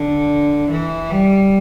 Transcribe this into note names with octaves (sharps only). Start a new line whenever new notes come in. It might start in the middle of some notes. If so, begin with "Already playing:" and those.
Already playing: D3
E3
G3